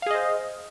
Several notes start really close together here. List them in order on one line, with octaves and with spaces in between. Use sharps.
F5 G#4 D#5 C5